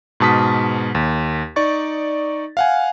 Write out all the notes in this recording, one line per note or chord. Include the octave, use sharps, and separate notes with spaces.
G#2 B2 A5 D#6 B6
D#2
D#4 D5 C#6 A6
F5 F#5 G#5